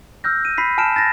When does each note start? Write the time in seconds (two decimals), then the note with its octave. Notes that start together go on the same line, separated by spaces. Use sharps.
0.24 E6 F6 G6 A#6
0.45 D#7
0.58 B5 B6 C7
0.78 G#5 A5 F6 D7 E7
0.96 A6 A#6